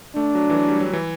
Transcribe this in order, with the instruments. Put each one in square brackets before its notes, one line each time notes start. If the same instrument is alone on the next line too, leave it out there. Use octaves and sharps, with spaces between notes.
[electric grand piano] A3 [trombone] D4
[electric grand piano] F#3
E3
F#3
G3
F#3
E3